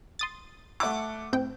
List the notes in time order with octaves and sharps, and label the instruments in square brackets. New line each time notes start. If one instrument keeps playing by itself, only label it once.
[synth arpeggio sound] C6 D#6 A6
[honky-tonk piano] A3 F#5 D6
[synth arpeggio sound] A2 C4 G5